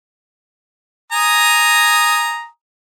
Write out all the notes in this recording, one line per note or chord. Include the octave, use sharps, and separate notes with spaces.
G#5 A#5 D#6